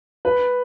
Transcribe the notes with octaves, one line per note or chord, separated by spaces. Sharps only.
B4